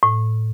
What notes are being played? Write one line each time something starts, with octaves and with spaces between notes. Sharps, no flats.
A2